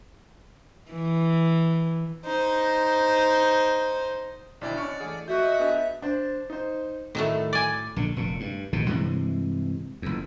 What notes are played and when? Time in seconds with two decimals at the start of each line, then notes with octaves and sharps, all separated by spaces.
0.92 E3
2.25 D#4 C5
4.61 B1 D3 C4 E4 D5
4.77 B2 C#4 D4 C#6 F6 C#7
5.00 E3 A3 G#4
5.28 F2 A#2 F#4 D#5 E5 G6
5.59 B3 D4 G#4
6.02 D4 C5
6.50 D#4 C5
7.15 A2 D#3 F#3 A3
7.53 D5 G#5
7.96 A#1 D3
8.16 F1 A#2
8.40 G2
8.73 A#1 G#2 B2 D3
8.87 G2 C3 E3 G#3
10.02 F#1 E2